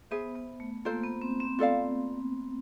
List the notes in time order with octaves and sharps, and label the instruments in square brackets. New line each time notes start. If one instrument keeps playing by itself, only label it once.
[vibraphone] B3 [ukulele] G#4 C5 E5
[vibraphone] B3
A3
[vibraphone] A#3 [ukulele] F4 A4 C5
[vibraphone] B3
C4
C4
[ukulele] F4 A4 D5 F5